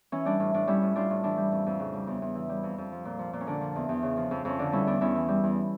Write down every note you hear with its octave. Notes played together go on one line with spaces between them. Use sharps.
E3 C#4
G3 D4
A2
A2 D4
G3 C#4 E4
A2
G3 D4 F4
A2
E3 D4
G3
F2
F2
C#3
G3
E2
E2
E3
G3
F2
F2
F3
A#2
F3
A#2
C#4
D3 D4
F3
E2
E2
C#3
F3
F2
F2 C#4
D3 D4
G3 C#4 E4
E2 D4
E2 C#4 E4
E3
G3
E2